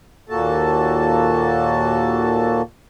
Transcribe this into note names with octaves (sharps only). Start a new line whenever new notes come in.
D#2 A#2 A#3 F#4 A4 A5